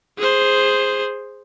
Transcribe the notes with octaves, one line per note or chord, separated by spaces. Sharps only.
G#4 C5